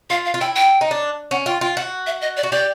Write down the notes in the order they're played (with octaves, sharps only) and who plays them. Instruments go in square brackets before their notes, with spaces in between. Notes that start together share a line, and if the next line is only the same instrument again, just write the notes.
[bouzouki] F4 [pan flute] F5
[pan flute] F5
[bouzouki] F4
[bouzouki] E4 [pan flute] G5
[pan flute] G5
[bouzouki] D#4
D4
[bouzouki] C#4 [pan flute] F#5
[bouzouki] F4 [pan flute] G5
[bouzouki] F4 [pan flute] G5
[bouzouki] F#4 [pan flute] F#5
[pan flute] E5
D#5
D5
[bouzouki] F#4
[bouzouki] G4 [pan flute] D5